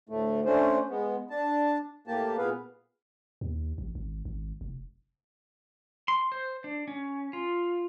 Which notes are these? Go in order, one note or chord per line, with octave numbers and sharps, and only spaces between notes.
D2 A2 A3
A3 C#4 D4 C5
G#3 B3
D4 A5
A2 A#3 G4 A5
A#2 B3 G#4 B4 F5
D#2
A1
G#1
G#1
F1
C6
C5
D4
C#4
F4